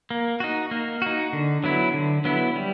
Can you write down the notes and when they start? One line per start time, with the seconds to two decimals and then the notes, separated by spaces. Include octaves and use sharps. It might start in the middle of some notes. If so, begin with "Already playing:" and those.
0.11 A#3
0.40 D#4 F#4
0.71 A#3
1.02 D#4 F#4
1.33 D3
1.64 F#3 B3 E4
1.94 D3
2.25 F#3 B3 E4
2.56 G3